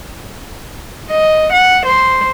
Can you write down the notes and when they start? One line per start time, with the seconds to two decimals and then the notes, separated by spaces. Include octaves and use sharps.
1.11 D#5
1.53 F#5
1.86 C5